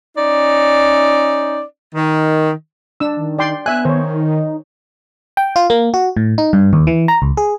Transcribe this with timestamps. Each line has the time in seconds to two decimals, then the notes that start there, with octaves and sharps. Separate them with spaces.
0.16 C#4 D#4 D5
1.95 D#3
3.00 D4 E6
3.17 D#3
3.39 D5 G5 C6
3.66 B3 E5 G#5 F#6
3.85 D#3 C5 C#5
4.13 D#4
5.37 G5
5.56 F4
5.70 A#3
5.94 F#4
6.17 A2
6.38 D#4
6.53 G2
6.73 D#2
6.87 E3
7.08 A#5
7.22 C#2
7.37 G#4